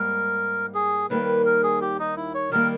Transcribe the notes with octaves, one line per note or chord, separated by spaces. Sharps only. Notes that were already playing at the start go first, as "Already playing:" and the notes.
Already playing: G#2 G3 A#3 A#4
G#4
D#2 D#3 G3 A#3 B4
A#4
G#4
G4
D#4
E4
C#5
D#3 G3 A#3 A#4